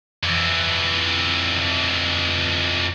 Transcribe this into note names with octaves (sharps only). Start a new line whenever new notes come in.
F2 E3